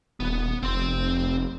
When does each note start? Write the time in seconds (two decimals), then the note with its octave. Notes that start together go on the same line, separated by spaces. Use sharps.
0.20 D#1 B3
0.63 F1 C4 C6